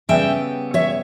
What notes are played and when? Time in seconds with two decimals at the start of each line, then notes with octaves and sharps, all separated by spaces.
0.09 C#3 G3 B3 E5 G5
0.74 C#5 E5